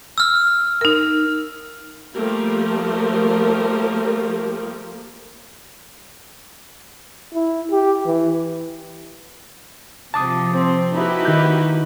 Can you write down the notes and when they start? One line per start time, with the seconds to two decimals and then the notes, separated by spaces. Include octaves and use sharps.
0.18 E6 F6
0.81 D#4 A#4
2.14 F3 G3 A3 A#3 G4 A#4
7.34 E4
7.71 G4
8.06 E3
10.14 C3 F3 A5 D6 D#6
10.53 C4
10.95 A#3 D#4 E4 F#4 G4 B4
11.25 D#3 G6